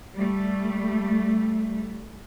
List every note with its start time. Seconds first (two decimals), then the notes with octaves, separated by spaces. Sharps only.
0.16 G3 A3